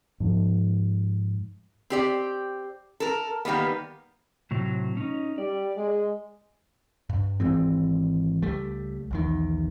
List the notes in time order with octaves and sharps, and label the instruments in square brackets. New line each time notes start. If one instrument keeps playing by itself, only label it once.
[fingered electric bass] G#2 F3
[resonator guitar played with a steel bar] C4 G4 D5
A4 A#4
D#3 G3 A#3 B3
[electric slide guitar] A2 C3 F#3
C#4 D#4
[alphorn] G3 [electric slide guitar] D5
[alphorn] G#3
[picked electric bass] G2
G#1 E3 G#3 C4
C#2 G3 A3
B1 E2 D#3